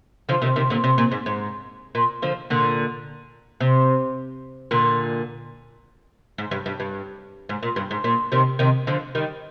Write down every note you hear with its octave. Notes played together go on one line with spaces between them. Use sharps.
D3 F3
C3 D#3
C3 D#3
A#2 D3
C3
A#2
G#2
G#2
A#2
D3 F3
A#2 D3
C3
A#2 D3
G#2
G2
G2
G2
G#2
A#2
G2
G#2
A#2
C3 D#3
C3 D#3
D3 F3
D#3 G3